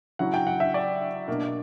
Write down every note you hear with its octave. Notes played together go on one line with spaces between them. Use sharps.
C#3 F#3 C#4 E4 F#5
G5
F#5
E5
D5
B2 A#3 D4